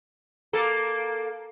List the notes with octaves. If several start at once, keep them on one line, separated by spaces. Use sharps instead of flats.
A#3 A4